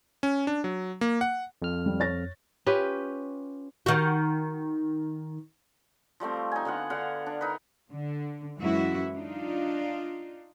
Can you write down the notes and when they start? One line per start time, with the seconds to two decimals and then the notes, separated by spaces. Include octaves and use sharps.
0.23 C#4
0.47 D4
0.64 F#3
1.01 A#3
1.21 F#5
1.62 F2 F6
1.86 G3
2.00 C#5 A6 A#6
2.66 C#4 F4 G4 B4
3.86 D#3 F#4
6.20 F3 G3 A3 C4
6.52 D#4 G#5
6.65 D3 B3 F4 F#5
6.90 D3 F5 F#5
7.26 D4
7.41 D#4 A#4 B4
7.91 D3
8.58 F#2 E3 G#3 C#4 E4 F#4
9.14 D4 D#4 F4